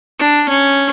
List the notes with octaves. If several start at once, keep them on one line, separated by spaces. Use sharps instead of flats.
D4
C#4